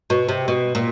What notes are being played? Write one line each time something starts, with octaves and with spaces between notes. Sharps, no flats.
B2
C3
B2
A#2